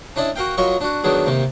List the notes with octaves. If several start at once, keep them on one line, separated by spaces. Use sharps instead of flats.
C#4 D4 E4 D5 D#5
F#4 A#4 F5 G5
F#3 F4 A#4 C#5 D#5 C#6
D4 F#4
D#3 F#3 B3 D4 G#4
C3 D#3 A#3